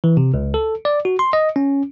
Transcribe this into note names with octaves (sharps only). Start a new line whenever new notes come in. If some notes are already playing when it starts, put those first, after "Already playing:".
E3
C3
C#2
A4
D5
F#4
C6
D#5
C#4